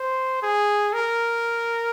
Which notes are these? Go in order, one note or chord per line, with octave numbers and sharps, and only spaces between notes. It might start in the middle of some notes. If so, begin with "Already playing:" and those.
Already playing: C5
G#4
A#4